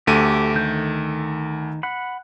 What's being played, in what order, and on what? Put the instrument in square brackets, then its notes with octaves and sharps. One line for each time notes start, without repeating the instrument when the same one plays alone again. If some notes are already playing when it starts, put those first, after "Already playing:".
[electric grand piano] D2 A3 D#7 [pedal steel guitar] G4
[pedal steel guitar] D#3 G6
F#5 B5